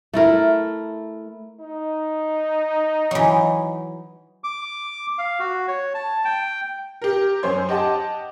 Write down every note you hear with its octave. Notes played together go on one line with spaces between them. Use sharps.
A3 E4 A#4
D#4
E3 F#3
D6
F5
F#4
C#5
A5
G5
G4 A#4
F#2 C5 C#5 C6 G#6
G4 D#5 F#5 A5 D6